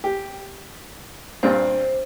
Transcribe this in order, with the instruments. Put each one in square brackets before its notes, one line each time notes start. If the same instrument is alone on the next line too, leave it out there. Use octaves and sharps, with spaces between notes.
[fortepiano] G4
[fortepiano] G2 A#2 C4 [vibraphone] C5